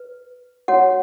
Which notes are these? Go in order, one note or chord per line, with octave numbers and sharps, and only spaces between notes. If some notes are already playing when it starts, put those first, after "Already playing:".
Already playing: B4
F#4 C#5 F#5